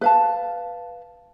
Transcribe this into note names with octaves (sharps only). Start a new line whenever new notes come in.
B4 F5 A5